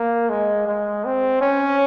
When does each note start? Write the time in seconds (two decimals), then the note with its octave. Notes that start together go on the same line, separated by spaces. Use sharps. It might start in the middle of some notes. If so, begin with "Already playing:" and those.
Already playing: A#3
0.30 G#3
0.67 G#3
1.05 C4
1.41 C#4